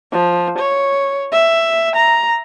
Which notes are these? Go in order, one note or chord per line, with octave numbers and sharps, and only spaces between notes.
F3
C#5
E5
A#5